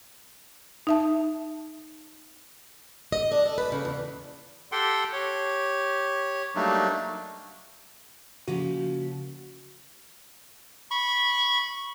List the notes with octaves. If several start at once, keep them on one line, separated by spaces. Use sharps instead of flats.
D#4 E5 A5
D#5
D4
A4
B4
C#3
E2
G4 A4 F#5 G5 C6
G4 C#5
F#3 G3 A3 A#3 D4 D#4
C#3 F3 A#3 F#4
B5 C#6